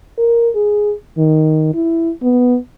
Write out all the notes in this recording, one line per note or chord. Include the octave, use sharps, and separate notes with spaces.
A#4
G#4
D#3
E4
B3